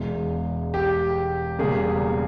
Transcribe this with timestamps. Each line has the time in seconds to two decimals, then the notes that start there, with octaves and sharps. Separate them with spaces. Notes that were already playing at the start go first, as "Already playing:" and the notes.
Already playing: E1 E2 E3 G#3
0.74 G4
1.58 E1 E2 C#3 G3 A#3 G#4